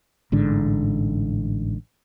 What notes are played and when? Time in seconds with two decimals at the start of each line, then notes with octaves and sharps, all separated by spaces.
0.32 A1 G#2 D3